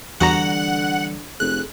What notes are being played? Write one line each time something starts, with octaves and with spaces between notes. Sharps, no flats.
E2 D3 E3 G3 F#4 F#5 A#5
F1 G#4 A4 F#6